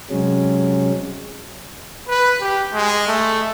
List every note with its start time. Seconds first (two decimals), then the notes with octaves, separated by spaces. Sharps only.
0.10 C3 F#3 G#3 C#4
2.08 B4
2.41 G4
2.74 G#3
3.07 A3